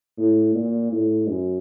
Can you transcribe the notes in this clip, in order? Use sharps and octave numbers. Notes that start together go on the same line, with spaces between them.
A2
A#2
A2
F#2